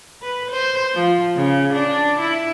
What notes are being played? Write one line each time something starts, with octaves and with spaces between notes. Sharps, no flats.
B4
C5
F3
C#3
D4
E4